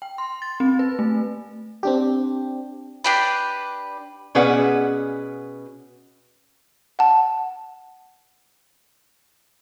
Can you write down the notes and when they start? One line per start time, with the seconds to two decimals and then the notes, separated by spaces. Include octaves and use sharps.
0.02 G5
0.18 C6
0.42 A6
0.60 C4
0.79 B4
0.99 A3
1.83 C4 D4 G4
3.04 D4 G4 B4
4.35 B2 C#4 G#4 B4 D5 F#5
6.99 F#5 A5